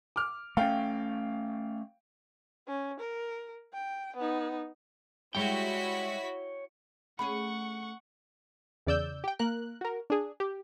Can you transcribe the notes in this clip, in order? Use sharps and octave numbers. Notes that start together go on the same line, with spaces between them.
D6 F6
A3 C#4 F5 G5
C#4
A#4
G5
B3 D#4
G3 G#3 E4 F#4 C#5 G5 B6
A3 C#4 G#4 F#5 B5 C#6
E2 C#3 D5 E6 G6
G4 G5
A#3 A#4 F#6
F#4 A#4
D4 G#4
G4